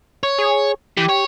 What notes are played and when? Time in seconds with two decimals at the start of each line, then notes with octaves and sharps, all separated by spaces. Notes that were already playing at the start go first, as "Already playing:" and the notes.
0.23 C#5
0.39 G#4
0.97 E3 G4
1.09 C#5